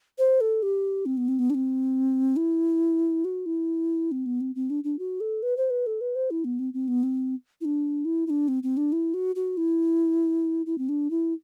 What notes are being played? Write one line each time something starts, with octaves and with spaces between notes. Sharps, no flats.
C5
A4
G4
C4
B3
C4
B3
D4
C4
E4
F#4
E4
C4
B3
C4
C4
D4
D4
F#4
A4
B4
C5
B4
A4
B4
C5
E4
B3
C4
C4
B3
C4
E4
D4
E4
E4
D4
C4
C4
D4
E4
F#4
F#4
E4
E4
C4
D4
E4